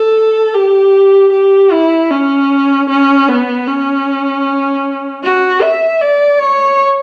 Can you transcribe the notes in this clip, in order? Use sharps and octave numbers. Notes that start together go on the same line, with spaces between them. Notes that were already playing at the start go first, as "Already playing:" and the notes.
Already playing: A4
G4
G4
E4
C#4
C#4
B3
C#4
F#4
E5
D5
C#5